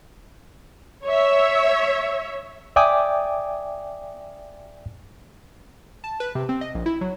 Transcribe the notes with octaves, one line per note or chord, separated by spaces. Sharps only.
C#5 E5
D5 E5 G5 G#5 D6 D#6
A5
B4
C3
C4
D#5
A#1
E4
F#3